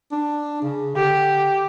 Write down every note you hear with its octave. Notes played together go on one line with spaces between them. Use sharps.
D4
C#3
D3 G4